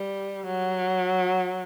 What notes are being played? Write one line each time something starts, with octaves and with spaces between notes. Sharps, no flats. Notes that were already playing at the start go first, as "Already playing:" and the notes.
Already playing: G3
F#3